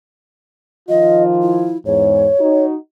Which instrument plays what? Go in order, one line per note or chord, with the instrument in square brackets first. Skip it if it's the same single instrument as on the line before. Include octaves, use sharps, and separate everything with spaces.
[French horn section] D#3 F3 F4 [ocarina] D#5
[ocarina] E4
[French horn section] E2 G#2 [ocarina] C#5
[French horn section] D#4 F#4